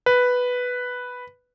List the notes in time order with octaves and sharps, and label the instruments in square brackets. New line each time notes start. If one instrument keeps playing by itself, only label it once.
[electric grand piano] B4